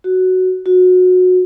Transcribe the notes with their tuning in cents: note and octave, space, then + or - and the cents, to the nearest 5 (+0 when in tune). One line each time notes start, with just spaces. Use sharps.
F#4 +5
F#4 -20